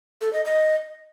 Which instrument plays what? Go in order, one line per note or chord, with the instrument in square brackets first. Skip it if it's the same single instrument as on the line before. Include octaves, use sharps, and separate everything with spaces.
[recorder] A4
D#5
D#5